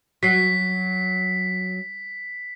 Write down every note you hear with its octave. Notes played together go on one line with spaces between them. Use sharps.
F#3 B6 C7